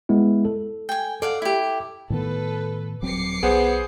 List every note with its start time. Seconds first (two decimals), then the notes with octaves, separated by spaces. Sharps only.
0.09 G#3 B3 E4
0.45 A4
0.89 G5 G#5
1.22 A4 D5 F5 F#5
1.42 E4 G4
2.10 A2 D#3 B3 A4 B4
3.02 D#1 F#3 C4 D6 C7 C#7
3.43 B1 B3 G#4 C5